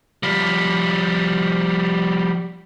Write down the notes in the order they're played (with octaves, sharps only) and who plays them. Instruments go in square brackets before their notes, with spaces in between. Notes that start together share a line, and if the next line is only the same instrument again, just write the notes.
[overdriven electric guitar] F3 G3